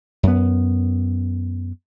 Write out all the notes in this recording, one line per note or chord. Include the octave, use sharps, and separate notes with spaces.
F#2 B3